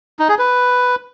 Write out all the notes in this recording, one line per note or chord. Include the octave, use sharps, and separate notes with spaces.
D#4
G#4
B4